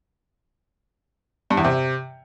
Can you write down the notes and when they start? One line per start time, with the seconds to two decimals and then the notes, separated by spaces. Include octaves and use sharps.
1.50 G2
1.57 E2
1.64 C3